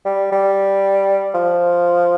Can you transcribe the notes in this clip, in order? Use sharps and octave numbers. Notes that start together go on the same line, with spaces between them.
G3
G3
F3